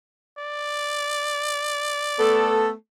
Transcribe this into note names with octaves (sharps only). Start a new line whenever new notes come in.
D5
A3 B3 A4